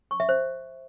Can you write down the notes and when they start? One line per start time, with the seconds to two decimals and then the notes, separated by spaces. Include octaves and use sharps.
0.11 C#6
0.20 E5
0.29 C5